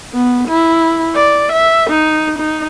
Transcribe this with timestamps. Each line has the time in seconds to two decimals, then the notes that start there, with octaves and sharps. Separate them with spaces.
0.14 B3
0.48 E4
1.15 D5
1.52 E5
1.90 D#4
2.38 D#4